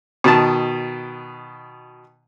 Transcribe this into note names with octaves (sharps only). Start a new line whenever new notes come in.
B2 D#3 A5